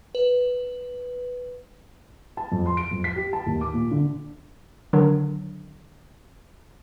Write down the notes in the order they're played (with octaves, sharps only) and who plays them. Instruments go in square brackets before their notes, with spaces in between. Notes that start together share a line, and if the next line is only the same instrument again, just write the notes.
[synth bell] B4
[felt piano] A5
F2
C6
D7
F2
B6
G4
A5
D#2
D6
A#2
D3
[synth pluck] D3 D#3 F#3 D4